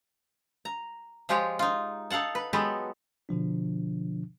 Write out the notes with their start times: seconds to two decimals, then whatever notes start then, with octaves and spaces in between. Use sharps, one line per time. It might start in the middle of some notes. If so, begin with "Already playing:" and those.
0.65 A#5
1.29 F3 G#3 F4 G4 G#4 C#5
1.59 D#4 F4
2.10 D#4 A4 F5 F#5 A5
2.35 B4
2.53 F#3 G#3 B3 G4 A4 B4
3.29 B2 D3 F3 D4